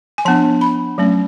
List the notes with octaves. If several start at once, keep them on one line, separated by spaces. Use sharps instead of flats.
G#5
F3 B3 D4 A5
B5
F#3 A3 C#4